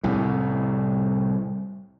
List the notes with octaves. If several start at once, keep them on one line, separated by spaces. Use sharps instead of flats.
C2 A2